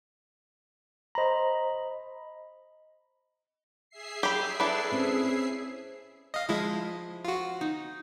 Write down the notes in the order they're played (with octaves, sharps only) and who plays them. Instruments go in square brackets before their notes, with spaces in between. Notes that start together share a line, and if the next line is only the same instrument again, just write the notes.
[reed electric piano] C5 A#5 [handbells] D#5 B5
[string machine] G#4 E5 C7
[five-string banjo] G4 B5
[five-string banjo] D4 B4 [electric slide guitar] E4 A4
[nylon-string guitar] C4 C#4
[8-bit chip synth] D#5 F5
[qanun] F3 [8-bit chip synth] G#3 E4 D#5
[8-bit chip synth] F4 F#4
[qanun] D#4